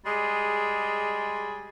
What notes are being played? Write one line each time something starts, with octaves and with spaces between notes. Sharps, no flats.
G3 G#3 G#4